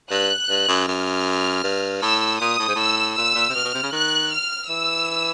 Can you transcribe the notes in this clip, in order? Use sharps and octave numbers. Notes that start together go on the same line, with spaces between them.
G2 F#6
G2
F#2
F#2 F6
G2
A2 E6
A#2 D#6
A2
G#2
A2 E6
A#2 E6
A#2
C3
B2 F6
B2
C3
C#3
D#3 F#6
F6
E3 E6